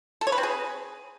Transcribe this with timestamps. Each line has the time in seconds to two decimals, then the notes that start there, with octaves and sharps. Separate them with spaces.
0.21 A4
0.27 C#5
0.32 B4
0.38 C4
0.43 G#4